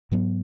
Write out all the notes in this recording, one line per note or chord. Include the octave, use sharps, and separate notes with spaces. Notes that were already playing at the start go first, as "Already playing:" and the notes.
G#2 F#3 B3